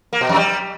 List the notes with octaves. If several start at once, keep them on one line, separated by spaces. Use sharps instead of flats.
A#3
B2
F2
G3